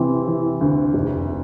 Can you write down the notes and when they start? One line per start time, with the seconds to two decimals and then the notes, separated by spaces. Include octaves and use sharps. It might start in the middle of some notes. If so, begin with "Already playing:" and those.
Already playing: C3 E3 C4
0.28 E3
0.61 D2
0.94 F1